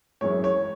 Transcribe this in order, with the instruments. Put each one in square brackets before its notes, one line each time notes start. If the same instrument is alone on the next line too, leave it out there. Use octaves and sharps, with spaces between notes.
[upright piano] F#2 E3 G#3 C#5
C#5